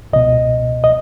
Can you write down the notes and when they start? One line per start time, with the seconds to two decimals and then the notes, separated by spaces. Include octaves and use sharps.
0.13 C#2 B2 D#5
0.84 D#5